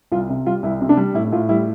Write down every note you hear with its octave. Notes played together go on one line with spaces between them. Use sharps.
C2 F4
C3
G3 F4
C2 E4
C3
D4
G3
A2 E4
A2 F4
G3 E4